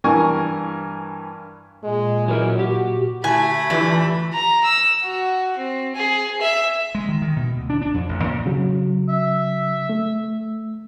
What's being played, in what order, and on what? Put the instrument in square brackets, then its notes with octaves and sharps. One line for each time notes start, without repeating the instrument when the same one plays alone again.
[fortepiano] G2 E3 A#4 G#5 C#6
[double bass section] A#2 [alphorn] G#3
[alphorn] E3 [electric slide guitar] F#3 A#4
[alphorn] F#4 [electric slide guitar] G4
[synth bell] D3 E4 [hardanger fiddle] A3 B5 [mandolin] G#5
[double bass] E3 [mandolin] D4 [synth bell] F4 G4 E5
[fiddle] A#5
E6
F#4
C4
G#4
E5
[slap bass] G#3
D#3
D#3
B2
D2
D4
D4
F2
A1
A#2
[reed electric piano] C#3 F#3
[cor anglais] E5
[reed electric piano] A3